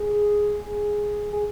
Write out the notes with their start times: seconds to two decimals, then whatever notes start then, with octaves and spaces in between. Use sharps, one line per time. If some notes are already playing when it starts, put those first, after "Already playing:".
Already playing: G#4
1.33 G#4